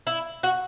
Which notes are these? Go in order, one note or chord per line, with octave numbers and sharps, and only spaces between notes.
E4
F#4